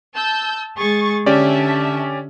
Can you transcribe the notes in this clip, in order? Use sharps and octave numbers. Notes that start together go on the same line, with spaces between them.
A5 E6 G6
G#3 G#4 C#6 A6
D3 C#4 G4 D5 E5 A5